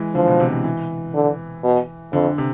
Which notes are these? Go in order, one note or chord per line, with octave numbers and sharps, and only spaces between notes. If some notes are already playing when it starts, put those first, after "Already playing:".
Already playing: E3 G#3
D3 F3
B2
C3
E3
E3
D3
B2
F2 D3
C3